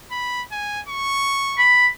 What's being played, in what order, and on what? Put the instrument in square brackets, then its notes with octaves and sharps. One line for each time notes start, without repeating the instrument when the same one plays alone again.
[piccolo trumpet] B5
G#5
C#6
[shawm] B5